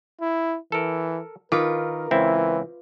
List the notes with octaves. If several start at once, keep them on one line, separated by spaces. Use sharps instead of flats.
E4
E3 A4 A#4
D#3 F4 A#4 B4 D6
C#2 E3 C4 E4